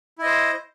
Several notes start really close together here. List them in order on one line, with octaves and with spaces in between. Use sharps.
E4 D#5 C5